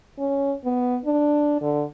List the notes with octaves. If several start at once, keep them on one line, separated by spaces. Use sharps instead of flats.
C#4
B3
D4
D3